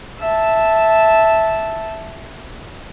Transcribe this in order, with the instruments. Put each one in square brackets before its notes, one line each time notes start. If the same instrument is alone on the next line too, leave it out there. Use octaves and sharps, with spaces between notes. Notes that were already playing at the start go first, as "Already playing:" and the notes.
[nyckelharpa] E5 A5